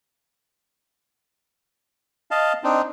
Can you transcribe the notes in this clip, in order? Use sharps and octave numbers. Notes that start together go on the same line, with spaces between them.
D#5 F5 A5
C4 D4 D#4